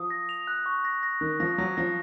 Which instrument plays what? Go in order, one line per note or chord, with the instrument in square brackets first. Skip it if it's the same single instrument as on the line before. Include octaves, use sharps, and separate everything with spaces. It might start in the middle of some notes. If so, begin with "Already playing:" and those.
Already playing: [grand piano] F3 [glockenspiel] D#6
[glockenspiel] A#6
F7
F#6
C#6
A#6
A#6
[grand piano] D#3 [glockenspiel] F#6
[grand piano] F3 [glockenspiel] A#6
[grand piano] F#3 [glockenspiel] A#6
[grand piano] F3 [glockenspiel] A#6